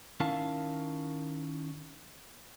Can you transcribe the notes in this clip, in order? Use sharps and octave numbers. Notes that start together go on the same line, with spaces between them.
D#3 C#4 E4 A#4 F5 A5